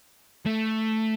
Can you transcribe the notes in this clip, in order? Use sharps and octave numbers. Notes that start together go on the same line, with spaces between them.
A3